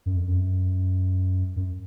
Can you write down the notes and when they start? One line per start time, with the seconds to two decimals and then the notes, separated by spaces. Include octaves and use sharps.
0.06 F#2
0.16 F2
0.28 F#2
1.56 F#2